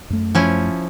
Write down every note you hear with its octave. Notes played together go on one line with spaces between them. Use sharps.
F#2 A3
F3 C#4 E4